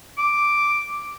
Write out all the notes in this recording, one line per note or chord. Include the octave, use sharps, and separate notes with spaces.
D6